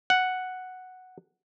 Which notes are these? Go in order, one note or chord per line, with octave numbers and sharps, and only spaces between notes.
F#5